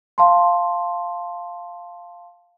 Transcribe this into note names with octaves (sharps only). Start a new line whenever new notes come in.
F5 A5 C6